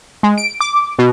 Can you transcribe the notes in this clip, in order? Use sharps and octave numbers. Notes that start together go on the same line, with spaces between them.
G#3
D7
D6
B2